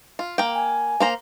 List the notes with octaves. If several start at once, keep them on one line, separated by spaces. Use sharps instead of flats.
F4
A#3 G5
G#5
A#3 C5 A#5